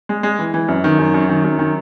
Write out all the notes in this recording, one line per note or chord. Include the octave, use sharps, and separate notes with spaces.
G#3
G#3
E3
E3
F#2
D#3
F#2
F#2
D#3
F#2
D#3